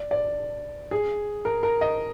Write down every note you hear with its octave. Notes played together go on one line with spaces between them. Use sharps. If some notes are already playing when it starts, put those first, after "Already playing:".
Already playing: D5
D5
G#4
A#4
A#4
D#5